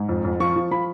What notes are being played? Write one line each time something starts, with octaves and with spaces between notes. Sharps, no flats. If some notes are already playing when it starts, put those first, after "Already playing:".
Already playing: G#2
F2
F2
F3 C#6
F3
F3 B5